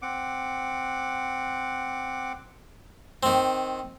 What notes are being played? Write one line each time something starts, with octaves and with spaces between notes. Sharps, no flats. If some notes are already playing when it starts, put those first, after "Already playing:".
C4 F#5 D6
D#3 C4